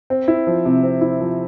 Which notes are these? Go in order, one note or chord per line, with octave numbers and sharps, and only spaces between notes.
C4
E4
F3
C3
C4
E4
F3